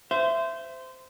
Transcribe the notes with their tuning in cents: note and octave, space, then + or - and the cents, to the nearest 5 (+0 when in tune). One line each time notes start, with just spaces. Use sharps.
C5 -20 E5 +20